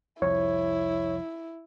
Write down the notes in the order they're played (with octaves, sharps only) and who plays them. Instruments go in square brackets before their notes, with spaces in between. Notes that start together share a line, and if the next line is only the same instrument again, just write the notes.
[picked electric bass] C2 F2 [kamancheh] E4 [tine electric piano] C#5